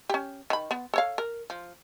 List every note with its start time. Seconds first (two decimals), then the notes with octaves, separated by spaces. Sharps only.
0.09 C#4 G4
0.50 D#3 B5
0.71 B3
0.94 A4 C#5 F5
1.18 A#4
1.50 F3